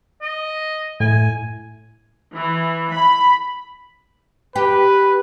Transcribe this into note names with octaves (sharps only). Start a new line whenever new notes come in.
D#5
A2 G#5
E3
B5
G4 B4